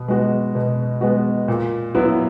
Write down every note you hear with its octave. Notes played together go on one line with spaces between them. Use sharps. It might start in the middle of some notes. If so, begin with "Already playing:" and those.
Already playing: B2
G#3 B3 F#4
B2
G#3 B3 F#4
A#2
F#3 B3 E4